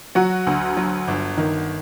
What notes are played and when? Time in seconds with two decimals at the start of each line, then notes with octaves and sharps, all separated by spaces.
0.15 F#3 F#4
0.47 D2
0.77 F#3
1.08 G1
1.37 D#3